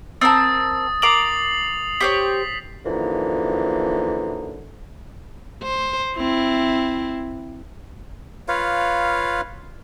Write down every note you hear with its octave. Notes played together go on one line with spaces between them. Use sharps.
C4 A#4 A5 D#6 A6
A#4 D6 C7 F7 F#7
G4 C5 C#5 B6
F#2 D3 E3 F3 A#3 D#4
C5
C4 E4
F4 B4 C#5 F5